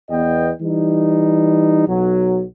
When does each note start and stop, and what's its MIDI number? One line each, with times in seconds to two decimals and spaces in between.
0.10 0.51 40
0.10 0.51 59
0.10 0.51 75
0.10 0.51 79
0.61 1.86 52
0.61 1.86 55
0.61 1.86 63
1.87 2.44 35
1.87 2.44 54